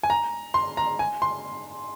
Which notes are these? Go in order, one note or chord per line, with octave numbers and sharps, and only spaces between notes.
G#5
A#5
C6
A#5
G#5
C6